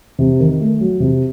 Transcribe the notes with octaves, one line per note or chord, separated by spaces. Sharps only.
C3
D#3
A3
F#3
C3